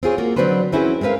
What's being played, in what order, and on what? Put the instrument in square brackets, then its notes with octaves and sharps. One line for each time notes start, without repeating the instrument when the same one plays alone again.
[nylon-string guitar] C4 F4 G#4 C#5
A#3 F4 F#4
D3 F#3 C4 D4 B4 C5
C4 C#4 E4 F#4 G#4 B4
G#3 C4 A#4 B4 F5